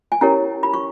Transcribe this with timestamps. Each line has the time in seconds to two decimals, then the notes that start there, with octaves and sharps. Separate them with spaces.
0.12 G#5
0.21 C#4 E4 G4 A#4 C#5 A#5
0.63 B5
0.74 C#6